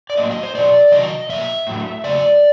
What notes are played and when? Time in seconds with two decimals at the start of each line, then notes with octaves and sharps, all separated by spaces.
0.10 D5
0.17 A2 F#3 A#3 D#5
0.31 D#5
0.43 C5
0.55 B2 F#3 A#3 D5
0.92 C3 D#3 F#3 D#5
1.29 B2 F#3 A#3 E5
1.67 A2 F#3 A3
2.04 C#3 F#3 A3 D5